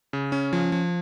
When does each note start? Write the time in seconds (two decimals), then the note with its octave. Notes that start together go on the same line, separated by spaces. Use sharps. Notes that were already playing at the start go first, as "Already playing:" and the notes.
0.13 C#3
0.32 C#4
0.53 F3
0.72 F3